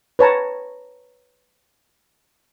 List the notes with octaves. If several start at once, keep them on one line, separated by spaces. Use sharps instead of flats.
B4 C#5 A5 A#5